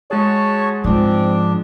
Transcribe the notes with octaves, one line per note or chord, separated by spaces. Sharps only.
G#3 F#4 G#4 C#5 A5
G#2 F3 C4 D4